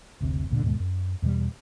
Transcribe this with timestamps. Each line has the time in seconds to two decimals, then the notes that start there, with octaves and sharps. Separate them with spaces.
0.21 F#1 D2 C3
0.50 D2 A#2 D3
0.63 D#2 G#2 B2 G#3
0.80 F#2
1.22 E2 B2 E3 G3